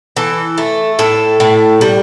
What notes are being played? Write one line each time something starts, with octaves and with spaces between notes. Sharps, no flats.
E3 A4
A3
A2 A4
A2
G3